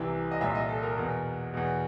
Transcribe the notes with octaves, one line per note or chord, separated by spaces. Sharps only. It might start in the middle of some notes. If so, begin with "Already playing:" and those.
Already playing: C2 C3 E3
D#5
C2 A#2 E5
D#5
A4
A#4
E2 B2
E2 B2